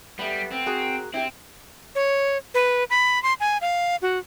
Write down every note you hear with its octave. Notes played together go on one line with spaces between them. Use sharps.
G3 A3 B3
C4
F#4 G#4 A#4
C4 E4 G4
C#5
B4
B5
C6
G#5
F5
F#4